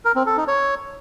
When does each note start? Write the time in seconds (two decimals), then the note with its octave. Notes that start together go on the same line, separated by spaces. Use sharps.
0.05 A#4
0.16 C4
0.26 A4
0.37 D#4
0.48 C#5